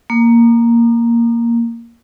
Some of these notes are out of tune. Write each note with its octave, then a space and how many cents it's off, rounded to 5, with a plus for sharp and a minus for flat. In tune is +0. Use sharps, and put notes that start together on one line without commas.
A#3 +0 D6 +45